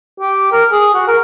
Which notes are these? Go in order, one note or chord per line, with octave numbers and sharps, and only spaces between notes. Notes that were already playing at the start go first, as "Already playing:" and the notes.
G4
A#4
G#4
F#4
A#4